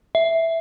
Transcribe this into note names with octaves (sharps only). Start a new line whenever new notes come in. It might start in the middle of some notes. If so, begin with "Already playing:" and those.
E5